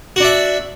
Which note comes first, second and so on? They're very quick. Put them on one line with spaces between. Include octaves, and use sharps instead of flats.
F#4 D4 E5